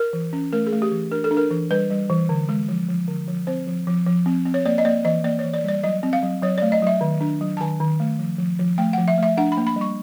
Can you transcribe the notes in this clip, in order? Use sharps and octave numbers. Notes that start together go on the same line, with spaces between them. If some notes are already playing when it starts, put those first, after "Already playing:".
Already playing: A#4
E3
C#4
A3 A#4
G#4
A3
G4
E3
D4 A#4
A4
D4
A#4
E3
G3 B4
G3
E3
D3
G#3
F3
F3
D3
F3
C4 C5
F3
F3
F3
C4
C4
C#5
A#3 D5
D#5
A#3 D5
E3 D#5
A#3 D5
C#5
E3
D5
G3 D5
F#3 D#5
C4
F5
F#3
F#3 C#5
A3 D5
D#5
F#3 E5
D#3
D4
F#3
A5
D#3 G#5
D#3
A3
F3
F3
F3
A3 G5
F3 F#5
E5
A3 E5
D4 F#5
B5
A#3
B5
G3
C#6